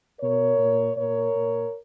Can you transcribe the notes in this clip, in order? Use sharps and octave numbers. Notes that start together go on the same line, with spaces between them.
B2 A#4 C#5
A#2
A#2 A#4 C#5
A#2